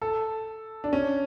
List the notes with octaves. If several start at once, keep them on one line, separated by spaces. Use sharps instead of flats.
A4
D4
C#4